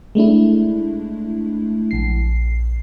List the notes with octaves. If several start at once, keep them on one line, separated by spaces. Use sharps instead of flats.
G#3 A3 D4 E4
A#1 C7